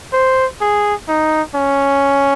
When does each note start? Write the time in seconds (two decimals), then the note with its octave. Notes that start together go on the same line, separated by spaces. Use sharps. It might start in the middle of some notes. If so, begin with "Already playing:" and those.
0.13 C5
0.61 G#4
1.09 D#4
1.55 C#4